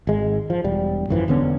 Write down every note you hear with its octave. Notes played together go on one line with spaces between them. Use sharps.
G#1 G#3
F3
E1 G3
G#1 F#2 E3 F3
E1 D3 B3 C#4